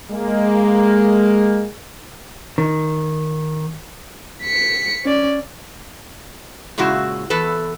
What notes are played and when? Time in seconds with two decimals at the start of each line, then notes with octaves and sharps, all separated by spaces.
0.12 G#3 A#3
2.58 D#3
4.44 B6 C#7
5.05 C#4 D5
6.78 A#2 C#3 G#3 E4 F#4
7.30 E2 A4 B4